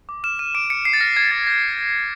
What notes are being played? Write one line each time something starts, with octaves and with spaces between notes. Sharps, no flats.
D6
F6 E7
F6 D#7
D6 D7
D6 C#7
F6 C7
A6
F6 A#6
D6 G#6
D6 A6
G6 A#6